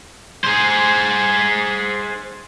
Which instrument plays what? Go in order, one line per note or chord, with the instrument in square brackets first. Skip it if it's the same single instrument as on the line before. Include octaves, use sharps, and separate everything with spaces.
[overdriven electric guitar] G#4 C5